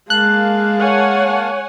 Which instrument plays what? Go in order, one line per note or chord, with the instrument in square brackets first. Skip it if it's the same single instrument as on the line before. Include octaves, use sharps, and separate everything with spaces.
[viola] G#3 [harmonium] A#3 F5 A5 [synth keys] F#6
[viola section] C#5 F#5 G#5